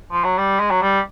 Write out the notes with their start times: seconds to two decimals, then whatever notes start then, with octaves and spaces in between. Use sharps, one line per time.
0.12 F3
0.24 F#3
0.38 G3
0.60 G#3
0.71 F#3
0.82 G3